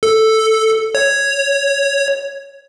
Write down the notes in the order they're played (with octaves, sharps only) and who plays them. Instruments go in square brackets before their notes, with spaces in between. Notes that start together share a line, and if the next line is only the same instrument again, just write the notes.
[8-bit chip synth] A4
C#5